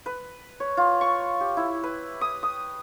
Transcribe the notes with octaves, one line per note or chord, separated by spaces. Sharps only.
B4
C#5
F4
C#6
G4
E4
B4
D#6
D#6